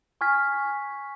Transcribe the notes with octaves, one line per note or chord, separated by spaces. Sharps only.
G#5 C#6 F6 G#6 B6